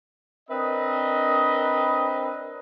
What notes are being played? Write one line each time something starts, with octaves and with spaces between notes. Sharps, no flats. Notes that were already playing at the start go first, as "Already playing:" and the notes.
C4 D4 A#4 B4 D#5